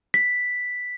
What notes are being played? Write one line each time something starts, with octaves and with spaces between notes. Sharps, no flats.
B6